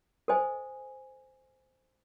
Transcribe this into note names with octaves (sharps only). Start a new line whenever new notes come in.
A4 C5 D#5 G#5